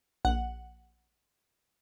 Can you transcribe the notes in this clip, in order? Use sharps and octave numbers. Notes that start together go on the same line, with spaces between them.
A#1 F#5